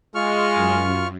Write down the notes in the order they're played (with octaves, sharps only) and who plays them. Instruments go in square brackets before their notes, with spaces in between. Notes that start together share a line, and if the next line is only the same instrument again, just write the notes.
[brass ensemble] G#3 [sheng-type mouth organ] F4 C#6 F6
[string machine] F#2